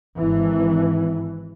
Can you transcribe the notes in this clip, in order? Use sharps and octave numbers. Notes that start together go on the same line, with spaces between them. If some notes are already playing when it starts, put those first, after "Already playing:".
G#1 E3